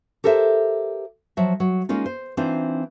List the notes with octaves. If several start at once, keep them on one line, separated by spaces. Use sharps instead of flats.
G4 A4 A#4 C5 E5
F3 F#3 E5
F#3
G#3 A#3 C#4 D#4 F4
C5
E3 C4 D4 D#4 F4 C5